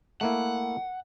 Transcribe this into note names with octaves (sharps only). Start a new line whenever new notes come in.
A3 A#3 E4 F#5